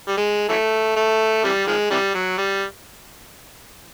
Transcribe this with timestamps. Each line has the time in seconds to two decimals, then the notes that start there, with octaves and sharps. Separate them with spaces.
0.08 G3
0.17 G#3
0.49 E3 F#3 A3
0.96 A3
1.44 C3 E3 G3
1.67 D#3 F3 G#3
1.91 C3 E3 G3
2.15 F#3
2.38 G3